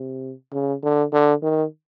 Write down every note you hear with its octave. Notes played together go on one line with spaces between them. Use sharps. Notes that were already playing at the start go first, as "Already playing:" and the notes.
Already playing: C3
C#3
D3
D3
D#3